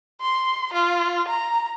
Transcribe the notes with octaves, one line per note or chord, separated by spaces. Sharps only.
C6
F4
A#5